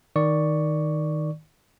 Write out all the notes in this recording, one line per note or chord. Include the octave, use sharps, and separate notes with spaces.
D#3 D5 C#6